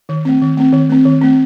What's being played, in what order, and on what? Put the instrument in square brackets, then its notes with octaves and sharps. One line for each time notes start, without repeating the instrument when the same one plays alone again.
[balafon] D#3
A3 C4
D#3
A3 C4
D#3
A3 C4
D#3
A3 C4